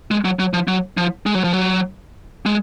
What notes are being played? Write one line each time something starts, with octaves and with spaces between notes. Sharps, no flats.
G#3
F#3
F#3
F3
F#3
F3
G#3
F#3
F3
F#3
G#3